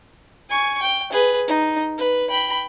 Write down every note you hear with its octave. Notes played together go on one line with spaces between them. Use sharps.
G#5 C#6
G5
G#4 B4
D#4
B4
G5 B5